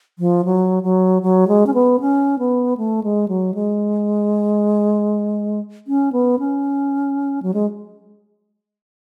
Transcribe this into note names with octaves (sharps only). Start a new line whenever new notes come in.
F3
F#3
F#3
F#3
G#3
C#4
B3
C#4
B3
A3
G#3
F#3
G#3
C#4
B3
C#4
F#3
G#3